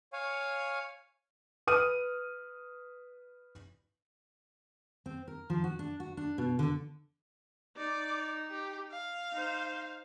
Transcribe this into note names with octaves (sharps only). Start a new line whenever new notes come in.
C#5 F5 G#5
B4 D#6 F6 D#7
C4
A#4
F3
F#4
D4
F#4
D4
B2
D3
D#4 D5
G4
F5
D#4 C5